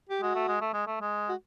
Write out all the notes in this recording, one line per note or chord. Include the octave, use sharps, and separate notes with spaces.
G4
G#3 F#4
A3
G#3
A3
G#3
A3
G#3
F#4